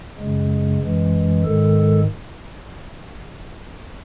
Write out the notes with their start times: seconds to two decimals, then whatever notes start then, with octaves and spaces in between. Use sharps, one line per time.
0.19 F#2 C#3 G#3
0.81 F#2 E3 G#3
1.44 G#2 D#3 G#3 A4